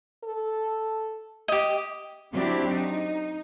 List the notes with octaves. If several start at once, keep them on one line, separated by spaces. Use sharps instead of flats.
A4
G4 D#5
F#3 C4 D4 E4 G4
D#4